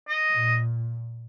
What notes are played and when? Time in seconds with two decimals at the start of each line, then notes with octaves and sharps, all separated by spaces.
0.08 D#5
0.32 A#2